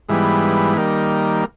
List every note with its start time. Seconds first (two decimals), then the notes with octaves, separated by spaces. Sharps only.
0.09 G#2 E3 G3 B3
0.77 D#3 G3 A#3